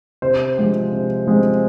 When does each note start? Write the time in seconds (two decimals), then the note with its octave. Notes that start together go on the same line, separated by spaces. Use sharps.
0.22 C3 C5
0.57 F3 G#3 C4
0.92 C3
1.27 F3 G#3 C4